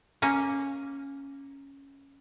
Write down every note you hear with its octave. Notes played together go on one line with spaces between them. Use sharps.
A#3 C#4